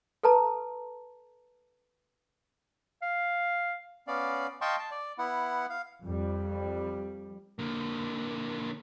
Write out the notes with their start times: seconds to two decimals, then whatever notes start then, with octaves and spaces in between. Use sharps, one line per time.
0.23 A4 B4 A5 A#5
3.02 F5
4.07 B3 C#4 D5 F5
4.61 D#5 F5 G5 A5 C6 C#6
4.79 A5
4.91 D5
5.18 B3 E4 F#5
5.70 F5
6.05 F2 G3
7.59 D3 A#3